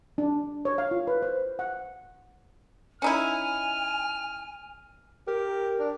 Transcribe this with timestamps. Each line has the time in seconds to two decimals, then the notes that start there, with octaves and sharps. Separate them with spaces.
0.18 D4
0.65 C#5
0.78 F5
0.91 F4
1.07 B4
1.22 C5
1.59 F#5
3.02 C#4 D#4 E4 G#5 F6
5.27 G4 A#4
5.79 D4